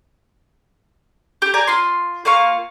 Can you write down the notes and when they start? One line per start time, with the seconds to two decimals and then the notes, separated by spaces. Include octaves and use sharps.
1.42 G4
1.54 D5 G#5 A#5
1.67 F4 C6
2.25 A#3 F4 F5 C#6